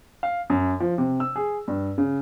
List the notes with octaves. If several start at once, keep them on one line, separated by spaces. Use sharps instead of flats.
F5
F#2
F3
C3
E6
G#4
G2
C#3